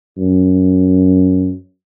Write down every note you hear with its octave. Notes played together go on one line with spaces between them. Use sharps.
F#2